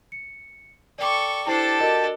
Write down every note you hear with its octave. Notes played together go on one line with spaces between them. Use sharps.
C#7
A4 D5 G5 C#6 D6
D4 E4 G4 A4 C5 A5 C7
F#4 A#4 D#5